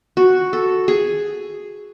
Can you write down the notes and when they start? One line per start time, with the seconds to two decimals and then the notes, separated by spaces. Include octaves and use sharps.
0.17 F#4
0.53 A4
0.88 G#4